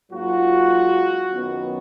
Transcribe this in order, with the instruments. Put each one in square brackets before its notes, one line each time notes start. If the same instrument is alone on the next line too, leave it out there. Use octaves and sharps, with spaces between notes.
[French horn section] G#2 F#3 A#3 F4 [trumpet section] F#4
[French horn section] F#2 D#3 F#3 B3